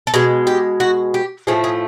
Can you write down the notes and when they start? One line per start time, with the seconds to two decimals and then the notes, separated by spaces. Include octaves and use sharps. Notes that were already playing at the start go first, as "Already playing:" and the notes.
0.07 A4
0.14 B2 G#3 G#4
0.47 G4
0.80 F#4
1.14 G4
1.47 A2 F3 A3 G#4
1.64 G#4